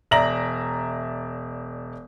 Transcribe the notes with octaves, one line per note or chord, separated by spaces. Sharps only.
E1 D5 E5 A#5 A#6 F#7